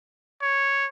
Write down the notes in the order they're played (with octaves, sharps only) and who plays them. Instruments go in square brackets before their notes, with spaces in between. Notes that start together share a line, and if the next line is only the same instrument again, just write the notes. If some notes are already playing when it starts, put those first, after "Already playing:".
[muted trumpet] C#5